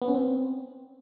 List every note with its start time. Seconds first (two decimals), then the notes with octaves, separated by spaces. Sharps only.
0.02 B3
0.08 C#4
0.14 C4